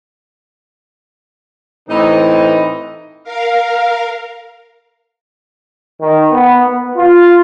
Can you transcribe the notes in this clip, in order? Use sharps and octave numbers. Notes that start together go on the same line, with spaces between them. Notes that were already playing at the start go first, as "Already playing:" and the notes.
A2 E3 C4 D#4
A#4 F5
D#3
B3
B3
F4